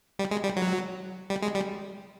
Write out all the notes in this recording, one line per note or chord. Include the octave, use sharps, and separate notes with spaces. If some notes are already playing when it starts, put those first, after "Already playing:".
G3
G#3
G3
F#3
G3
G#3
G3